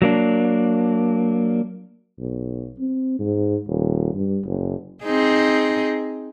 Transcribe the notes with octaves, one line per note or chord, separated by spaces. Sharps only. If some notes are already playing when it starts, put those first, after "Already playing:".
F#3 A#3 D4
B1
C4
G#2
D#1
G2
F#1
C4 D#4 G#4